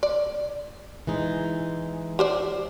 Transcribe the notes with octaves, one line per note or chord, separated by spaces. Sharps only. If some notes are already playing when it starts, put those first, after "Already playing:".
D5
E3 G#3 D#4
G4 C5 D5